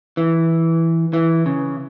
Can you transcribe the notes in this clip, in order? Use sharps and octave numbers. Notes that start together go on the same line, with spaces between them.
E3
E3
C#3